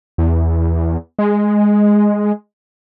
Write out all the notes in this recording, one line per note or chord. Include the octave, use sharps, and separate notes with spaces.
E2
G#3